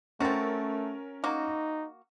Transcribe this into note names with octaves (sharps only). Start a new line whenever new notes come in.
A3 C4 C#4 F#4 A#4 A6
A#3 D#4 F#4